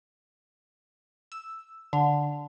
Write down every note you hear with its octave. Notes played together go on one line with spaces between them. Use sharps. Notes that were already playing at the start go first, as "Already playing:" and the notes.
E6
D3